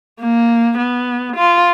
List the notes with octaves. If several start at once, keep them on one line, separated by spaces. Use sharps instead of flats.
A#3
B3
F4